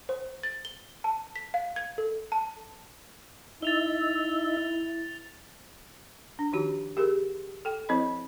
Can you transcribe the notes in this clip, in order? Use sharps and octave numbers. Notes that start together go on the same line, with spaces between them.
C5
A6
G7
A5
B6
F5
G#6
A4
A5
D#4 E4 E5 A6 F7 G7
D4
D#3 F3 D#4 F#4 G4
G4 G#4 A#4
A4 G5
F3 C4 E4 C5 D#5 B5